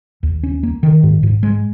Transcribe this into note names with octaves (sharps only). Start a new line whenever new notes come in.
D#2
C#4
A#3
D#3
G#2
G#2
G#3